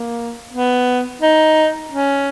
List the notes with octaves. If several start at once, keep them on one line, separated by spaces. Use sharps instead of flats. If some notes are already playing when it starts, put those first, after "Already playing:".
Already playing: A#3
B3
D#4
C#4